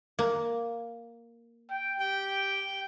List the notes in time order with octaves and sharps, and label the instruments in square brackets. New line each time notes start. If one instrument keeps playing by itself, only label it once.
[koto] A#3
[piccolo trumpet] G5
[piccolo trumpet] G4 [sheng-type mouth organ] G5